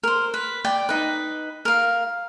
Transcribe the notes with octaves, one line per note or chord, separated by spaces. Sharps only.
A#4 C5
B4
D5 G5
D#4 B4
A#4 F5